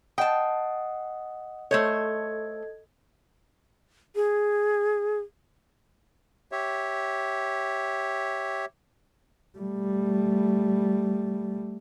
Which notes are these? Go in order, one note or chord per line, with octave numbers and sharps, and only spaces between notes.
D#5 F#5 G5 A5 D#6
A3 A4 C5 C#5 D#5 G#6
G#4
G4 C#5 E5
G3 A3